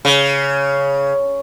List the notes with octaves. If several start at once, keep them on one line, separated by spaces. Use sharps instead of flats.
C#3